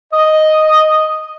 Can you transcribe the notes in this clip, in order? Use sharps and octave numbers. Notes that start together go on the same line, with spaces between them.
D#5